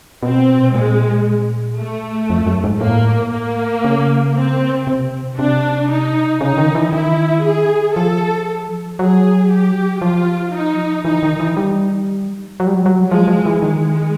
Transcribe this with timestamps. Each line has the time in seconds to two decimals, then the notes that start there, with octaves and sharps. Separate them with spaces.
0.23 B2 C4
0.75 A#2 G#3
1.78 A3
2.30 F2
2.46 F#2
2.64 G#2
2.81 A2 A#3
3.33 A#3
3.84 C#3
4.35 C4
4.87 C3
5.38 C3 D4
5.89 D#4
6.41 C#3 D#4
6.58 D#3
6.75 E3
6.93 D#3 E4
7.44 G#4
7.95 F3 A4
8.99 F#3 G#4
9.50 G4
10.01 F3 F4
10.54 D#4
11.05 E3 D#4
11.23 D#3
11.40 E3
11.57 G3
12.60 F#3
12.67 G3
12.75 F#3
12.86 F#3
13.10 F3 G#3
13.28 F3
13.46 E3
13.62 D#3 G#3